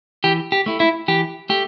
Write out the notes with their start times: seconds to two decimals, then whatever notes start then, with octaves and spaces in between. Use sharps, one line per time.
0.24 E3 G4
0.52 G4
0.66 A3 E4
0.80 E4
1.08 E3 G4
1.49 A3 G4